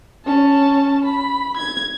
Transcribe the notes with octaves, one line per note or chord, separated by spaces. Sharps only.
C#4 A5
B5
G#6